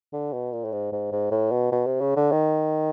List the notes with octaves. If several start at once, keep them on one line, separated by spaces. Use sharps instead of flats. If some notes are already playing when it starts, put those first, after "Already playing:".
D3
B2
A#2
A2
G#2
G#2
G#2
A2
B2
B2
C3
C#3
D3
D#3